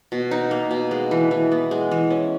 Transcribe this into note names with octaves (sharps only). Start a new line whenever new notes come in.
B2
D#4
A#3
B2
G#3
E3
E3
B3
G#3
E3
C#4